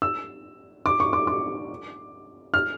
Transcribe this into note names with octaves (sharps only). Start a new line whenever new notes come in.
E6
D6
C#6
D6
D6
F6